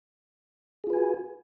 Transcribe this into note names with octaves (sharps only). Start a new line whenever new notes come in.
F4 F#4 G#4 B4 G#5